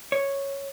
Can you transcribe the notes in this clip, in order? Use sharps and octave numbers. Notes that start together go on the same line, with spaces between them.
C#5